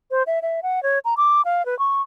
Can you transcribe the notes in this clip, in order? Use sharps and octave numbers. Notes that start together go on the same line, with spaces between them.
C5
E5
E5
F#5
C#5
A#5
D6
F5
B4
C#6